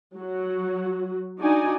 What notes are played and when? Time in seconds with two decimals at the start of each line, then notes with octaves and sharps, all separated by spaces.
0.16 F#3 F#4
1.39 D4 D#4 F#4 D5 G#5